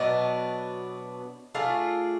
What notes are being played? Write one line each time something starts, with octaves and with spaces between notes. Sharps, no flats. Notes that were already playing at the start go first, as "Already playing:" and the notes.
Already playing: B2 F#3 B3 D4 D#5
A3 D4 F4 G#4 F5